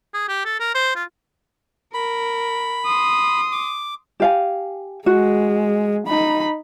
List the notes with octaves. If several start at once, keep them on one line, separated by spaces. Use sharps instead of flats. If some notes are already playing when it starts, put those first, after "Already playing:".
G#4
G4
A4
A#4
C5
F4
A#4 B5
C6 D#6
D6
G4 F5 G#5
G#3 F#4
D#4 B5